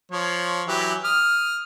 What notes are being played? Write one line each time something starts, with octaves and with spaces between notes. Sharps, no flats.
F3 C#5
E3 F#3 G4
D#6 F6